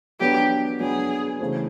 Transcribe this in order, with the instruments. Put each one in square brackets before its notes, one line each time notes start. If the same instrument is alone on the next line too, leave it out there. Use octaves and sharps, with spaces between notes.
[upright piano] F#3 B3 D4 [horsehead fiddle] G4
[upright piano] F#3 B3 D4 [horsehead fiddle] G#4
[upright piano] C#3 E3 A3 C4